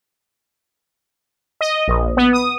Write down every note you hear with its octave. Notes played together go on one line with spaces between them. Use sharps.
D#5
A#1
B3
D#6